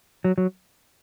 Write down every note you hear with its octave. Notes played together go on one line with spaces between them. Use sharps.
F#3
F#3